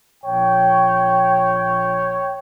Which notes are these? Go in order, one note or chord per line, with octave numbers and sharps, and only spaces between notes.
A#1 C#5 G5